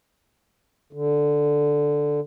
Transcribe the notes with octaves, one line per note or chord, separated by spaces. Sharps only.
D3